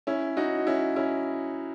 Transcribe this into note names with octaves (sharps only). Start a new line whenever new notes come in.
C#4 E4
D#4 F#4
C#4 E4
C#4 E4